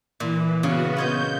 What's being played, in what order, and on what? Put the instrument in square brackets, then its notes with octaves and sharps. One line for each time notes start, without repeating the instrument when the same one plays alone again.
[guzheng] A#2 [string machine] E3
[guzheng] C#3 [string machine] B3 F#4
[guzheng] F4 C#5 D#5 [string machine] G6